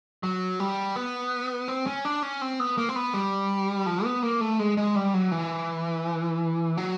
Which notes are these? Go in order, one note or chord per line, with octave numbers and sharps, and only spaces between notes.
F#3
G3
B3
C4
C#4
D4
C#4
C4
B3
A#3
C4
B3
G3
F3
B3
A#3
A3
G#3
G#3
G3
F#3
E3
F#3